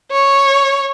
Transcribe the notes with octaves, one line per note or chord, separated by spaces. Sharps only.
C#5